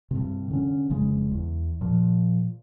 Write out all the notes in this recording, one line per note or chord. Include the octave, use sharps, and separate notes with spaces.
G2 C3
D3 C#4
F1 C#3 G#3
E2
A#2 F3